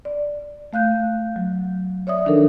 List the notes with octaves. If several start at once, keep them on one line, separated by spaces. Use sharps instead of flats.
D5
A3 F5 F#6 G6
F#3
C#5 D5 E5 D#6
D#3 F3 D4 D#4 A4 A#4